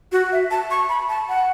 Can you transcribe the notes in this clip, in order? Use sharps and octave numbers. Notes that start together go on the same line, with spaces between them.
F#4
E5
A5
C#6
B5
A5
F#5